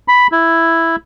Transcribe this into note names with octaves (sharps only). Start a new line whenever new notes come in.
B5
E4